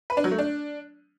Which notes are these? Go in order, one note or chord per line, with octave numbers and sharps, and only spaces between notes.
B4
D4
F#3
A3
D4